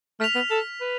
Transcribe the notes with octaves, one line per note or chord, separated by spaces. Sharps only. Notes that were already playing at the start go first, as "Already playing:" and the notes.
A3 F6 B6 F7
B3
A4
B4